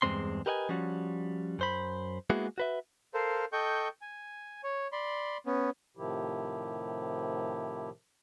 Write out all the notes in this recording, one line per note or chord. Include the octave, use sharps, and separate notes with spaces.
E2 G2 G#3 C4 C6
G4 A#4 B4 D#5 F#5 G#5
F3 G3 C#4 F#4
F#2 C5 B5
G#3 A#3 B3 E4 F#4 G#4
F#4 B4 E5
A4 A#4 C5 F5
A4 D#5 G5 C#6 G6
G#5
C#5
D5 B5 C6
B3 C#4
A2 C3 D#3 F3 E4 G4